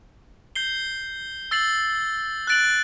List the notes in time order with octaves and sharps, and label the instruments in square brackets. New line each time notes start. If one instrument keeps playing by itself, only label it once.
[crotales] G6 C7 G7
E6 A6 C7 F#7
F#6 A6 D7 F#7